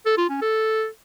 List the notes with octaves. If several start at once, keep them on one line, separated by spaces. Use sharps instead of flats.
A4
F4
C#4
A4